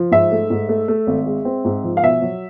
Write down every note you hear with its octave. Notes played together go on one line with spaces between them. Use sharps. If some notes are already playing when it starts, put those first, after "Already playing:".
Already playing: F3
G#2 E5
A3
G#2
A3
A3
G#1
G#3
C4
G#2
F3
F5
B2 E5
F#3